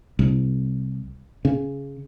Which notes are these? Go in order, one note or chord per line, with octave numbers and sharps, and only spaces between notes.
C2
C#3